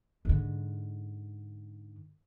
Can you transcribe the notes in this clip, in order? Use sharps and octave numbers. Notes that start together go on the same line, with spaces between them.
G#2 D3